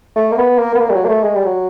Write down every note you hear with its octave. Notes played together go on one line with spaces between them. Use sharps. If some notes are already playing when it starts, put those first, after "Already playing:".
A3
A#3
B3
A#3
B3
A#3
G3
F#3
A#3
A3
G#3
G3
F#3